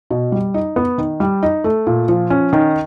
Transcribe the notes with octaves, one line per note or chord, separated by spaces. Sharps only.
B2
G3
D#4
B3
D#3
G3
D#4
A3
A#2
F3
C#4
D#3